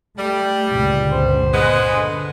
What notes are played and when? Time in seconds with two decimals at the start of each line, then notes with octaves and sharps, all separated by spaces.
0.19 G3 A3
0.70 G1 C#2 A#2
1.12 C5
1.54 G#3 B3
1.88 D3